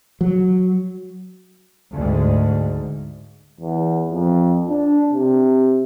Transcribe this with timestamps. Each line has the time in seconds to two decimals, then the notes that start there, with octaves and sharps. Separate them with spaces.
0.21 F#3
1.93 D2 G#2
3.60 E2
4.11 F2
4.69 D4
5.13 C3